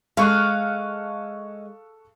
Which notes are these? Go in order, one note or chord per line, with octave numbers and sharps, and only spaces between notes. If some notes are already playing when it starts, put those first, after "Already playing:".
G#3 A4 F5 C#6 F#6